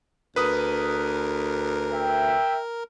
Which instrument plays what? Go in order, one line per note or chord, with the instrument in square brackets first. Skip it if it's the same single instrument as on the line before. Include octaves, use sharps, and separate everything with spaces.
[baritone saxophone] D2 [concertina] A#4 [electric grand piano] B4 D#6
[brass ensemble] E5 G5